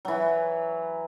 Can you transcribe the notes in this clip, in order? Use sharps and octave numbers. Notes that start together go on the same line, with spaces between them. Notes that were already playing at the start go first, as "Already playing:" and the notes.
E3 F#3